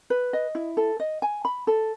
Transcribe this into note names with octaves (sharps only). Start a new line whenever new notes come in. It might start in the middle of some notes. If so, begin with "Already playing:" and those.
B4
D#5
E4
A4
D#5
G#5
B5
A4